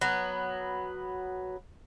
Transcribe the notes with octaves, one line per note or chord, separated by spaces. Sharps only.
F#3 B3